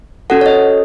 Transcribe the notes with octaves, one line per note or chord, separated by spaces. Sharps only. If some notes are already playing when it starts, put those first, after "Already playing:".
C#4 F#4 A4 F#5
C#5
D#5